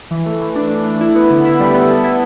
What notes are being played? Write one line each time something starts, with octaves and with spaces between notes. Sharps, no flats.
E3
A3
E3
D4
A3
A3
E4
B3
D3
E4
G3
B3
A4
E4